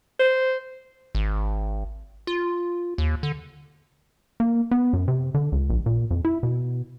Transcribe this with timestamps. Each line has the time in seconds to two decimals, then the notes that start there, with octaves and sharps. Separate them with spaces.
0.20 C5
1.15 G#1
2.27 F4
2.98 D#2
3.23 D3
4.40 A#3
4.71 B3
4.93 F#2
5.08 C3
5.35 D3
5.52 C#2
5.70 A#1
5.86 A#2
6.11 F2
6.25 E4
6.43 B2